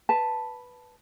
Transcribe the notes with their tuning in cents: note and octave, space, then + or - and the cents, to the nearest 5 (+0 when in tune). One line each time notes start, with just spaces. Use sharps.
B4 +0 A5 +0